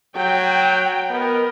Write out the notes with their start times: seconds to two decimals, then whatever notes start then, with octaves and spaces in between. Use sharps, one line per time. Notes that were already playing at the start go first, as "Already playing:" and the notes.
0.16 F#3 G5
1.10 B3 A#4 D#5